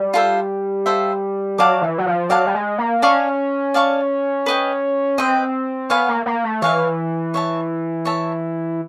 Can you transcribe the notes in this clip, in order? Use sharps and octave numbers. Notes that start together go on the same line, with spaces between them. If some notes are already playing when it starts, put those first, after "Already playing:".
Already playing: G3
F4 A4 C5 E5
F4 A4 C5 E5
F#3 D5 F5 A5 D6
E3
F#3
F3
F#3 D5 F5 A5 D6
G3
G#3
A#3
C#4 D5 F5 A5 C#6
D5 F5 A5 C#6
B4 D#5 G5
C4 B4 D#5 G5
B3 C#5 F5 G#5
A#3
A#3
A3
E3 C#5 F5 G#5
C#5 E5 A5
C#5 E5 A5